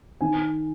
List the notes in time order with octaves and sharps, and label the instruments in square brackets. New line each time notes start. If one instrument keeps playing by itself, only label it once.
[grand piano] D#3 G#5